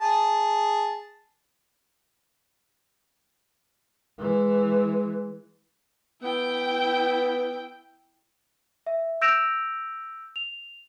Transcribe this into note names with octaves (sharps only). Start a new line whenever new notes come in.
G#4 A5
E3 G#3
B3 E4 G5
E5
E6 G6 A#6 D7 E7 F7
F7